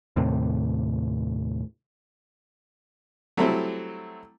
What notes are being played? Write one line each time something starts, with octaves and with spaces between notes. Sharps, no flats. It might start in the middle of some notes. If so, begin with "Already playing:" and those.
D#2 A2 C3
F#3 G3 A3 C4 E4